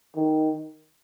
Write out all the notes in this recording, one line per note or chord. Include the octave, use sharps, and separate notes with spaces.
D#3